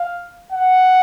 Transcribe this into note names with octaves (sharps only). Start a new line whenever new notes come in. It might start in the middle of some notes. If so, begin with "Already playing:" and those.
Already playing: F5
F#5